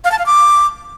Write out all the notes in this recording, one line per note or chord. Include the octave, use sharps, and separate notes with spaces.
F5
A5
F5
D6